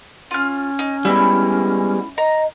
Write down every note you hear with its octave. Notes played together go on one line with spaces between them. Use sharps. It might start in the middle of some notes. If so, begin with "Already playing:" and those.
C#4 F4 F6
D#4
G3 G#3 B3 E4
D#5 A#5